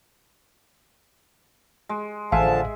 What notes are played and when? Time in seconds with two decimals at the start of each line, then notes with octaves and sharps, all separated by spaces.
1.89 G#3
2.32 A1 D3 F3 G#3 E5 F5 G#5 A5